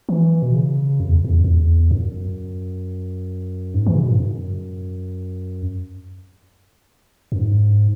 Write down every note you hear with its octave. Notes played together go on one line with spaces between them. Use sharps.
E3
B2
C#3
F#2
E2
E2
F#2
E2
F#2
G#2
E3
C#3
B2
G#2
F#2
F#2
G#2